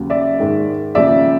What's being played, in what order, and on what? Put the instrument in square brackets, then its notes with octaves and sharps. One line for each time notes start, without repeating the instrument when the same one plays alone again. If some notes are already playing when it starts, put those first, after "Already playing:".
Already playing: [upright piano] D#2 C#3 F#3
D5 E5
G#2 D#3 G#3
D#2 C#3 F3 D5 E5